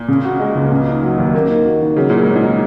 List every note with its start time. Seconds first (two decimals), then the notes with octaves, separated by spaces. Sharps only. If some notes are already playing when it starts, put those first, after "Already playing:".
Already playing: A#2
0.08 C#3
0.25 F#4
0.40 G#3
0.56 C#2
0.72 C#3
0.87 D#4
1.02 F#3
1.18 D#2
1.34 A#3
1.49 D#3
1.64 F#4
1.81 D#3
1.96 C#3 F#3
2.10 A#2 A#4
2.23 G#2 D#4
2.36 A#2
2.44 D#3